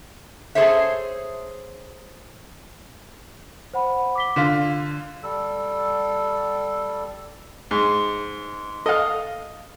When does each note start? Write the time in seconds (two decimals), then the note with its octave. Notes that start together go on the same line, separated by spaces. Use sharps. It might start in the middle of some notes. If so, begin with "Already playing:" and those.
0.55 G#4 A4 C5 C#5 E5
3.74 C5 F#5 B5
4.15 D6 B6 G7
4.36 D3 F4 B6
5.23 G3 A4
7.71 G#2
8.86 A4 D#5 F5